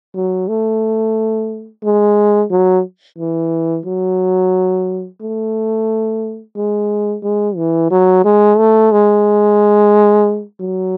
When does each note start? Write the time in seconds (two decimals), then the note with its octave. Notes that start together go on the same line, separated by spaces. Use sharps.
0.15 F#3
0.48 A3
1.83 G#3
2.51 F#3
3.18 E3
3.86 F#3
5.21 A3
6.56 G#3
7.23 G#3
7.56 E3
7.91 F#3
8.25 G#3
8.58 A3
8.92 G#3
10.60 F#3